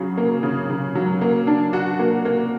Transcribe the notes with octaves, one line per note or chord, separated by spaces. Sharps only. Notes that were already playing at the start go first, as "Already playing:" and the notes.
Already playing: C#3 F#3
A#3
C#3
C#3
F#3
A#3
D4
F#4
A#3
A#3